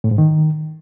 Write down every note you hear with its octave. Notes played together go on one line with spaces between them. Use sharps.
A2
G#2
D#3